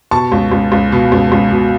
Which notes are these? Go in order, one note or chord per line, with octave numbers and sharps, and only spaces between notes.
B2 A5 C#6
C#2
C#2
C#2
B2
C#2
C#2
B2